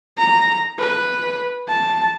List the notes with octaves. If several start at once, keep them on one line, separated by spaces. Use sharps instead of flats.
A#5
B4
A5